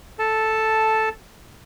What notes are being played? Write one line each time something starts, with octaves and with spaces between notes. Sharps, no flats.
A4 A5